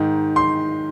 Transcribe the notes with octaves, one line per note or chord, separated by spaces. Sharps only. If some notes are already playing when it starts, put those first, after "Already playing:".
Already playing: G#2 D#3
C6